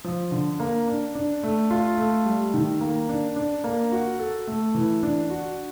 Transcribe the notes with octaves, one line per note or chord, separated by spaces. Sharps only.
F3
D3
A#3
D4
D4
A3
F4
A3
G3
D#3
A#3
D4
D4
A#3
F#4
A4
A3
E3
D4
F#4